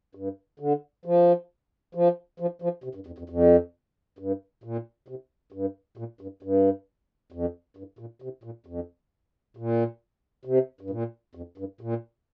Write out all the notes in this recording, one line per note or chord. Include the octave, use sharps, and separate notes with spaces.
G2
D3
F3
F3
F3
F3
C3
G2
F2
F2
F2
G2
A#2
C3
G2
A#2
G2
G2
F2
G2
A#2
C3
A#2
F2
A#2
C3
G2
A#2
F2
G2
A#2